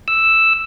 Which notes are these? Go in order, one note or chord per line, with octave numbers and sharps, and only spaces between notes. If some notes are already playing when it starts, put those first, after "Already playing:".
E6